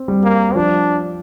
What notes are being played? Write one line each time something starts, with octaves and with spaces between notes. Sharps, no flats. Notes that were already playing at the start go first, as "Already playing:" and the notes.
Already playing: C4
G3
A#3
F3 D4